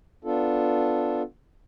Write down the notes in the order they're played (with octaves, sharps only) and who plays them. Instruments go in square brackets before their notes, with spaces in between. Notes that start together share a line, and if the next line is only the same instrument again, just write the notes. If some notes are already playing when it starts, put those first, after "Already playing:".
[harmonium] B3 D4 F4 A4